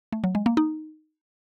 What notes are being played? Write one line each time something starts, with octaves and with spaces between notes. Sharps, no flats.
A3
F#3
G#3
A#3
D#4